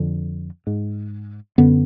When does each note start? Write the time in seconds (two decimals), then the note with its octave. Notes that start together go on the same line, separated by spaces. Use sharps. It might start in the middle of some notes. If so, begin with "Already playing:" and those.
Already playing: F2 D3
0.67 G#2
1.58 F#2 D3 B3